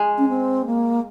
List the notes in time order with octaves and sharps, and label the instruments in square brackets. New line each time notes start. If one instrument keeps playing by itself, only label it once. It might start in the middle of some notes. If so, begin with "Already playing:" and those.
Already playing: [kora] G#3
[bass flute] C#4
C4
A#3